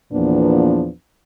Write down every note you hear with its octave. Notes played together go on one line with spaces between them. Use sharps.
E2 A#2 F3 A#3 B3 D4